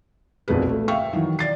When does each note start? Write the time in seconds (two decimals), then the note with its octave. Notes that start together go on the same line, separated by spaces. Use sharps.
0.48 E1 B1 F2 A#2 G#3 B4
0.69 A3
0.88 E5 F5 G5 C#6
1.13 D#3 E3 F#3
1.39 D5 A6 C7